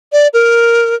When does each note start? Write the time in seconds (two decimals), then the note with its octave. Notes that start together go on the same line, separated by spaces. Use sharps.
0.12 D5
0.34 A#4